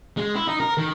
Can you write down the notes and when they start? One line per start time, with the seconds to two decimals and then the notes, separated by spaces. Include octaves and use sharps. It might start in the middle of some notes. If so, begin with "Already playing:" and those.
0.17 G#3
0.36 E4
0.48 D#4
0.60 A#4
0.78 D#3